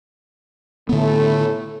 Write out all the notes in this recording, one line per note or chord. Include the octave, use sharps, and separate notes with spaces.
A2 D3 A3 B3